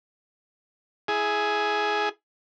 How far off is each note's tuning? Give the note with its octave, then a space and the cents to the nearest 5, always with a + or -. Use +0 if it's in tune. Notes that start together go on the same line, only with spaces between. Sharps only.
E4 +0 G#4 +10